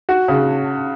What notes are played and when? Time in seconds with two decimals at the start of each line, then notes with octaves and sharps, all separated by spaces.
0.09 F#4
0.28 C#3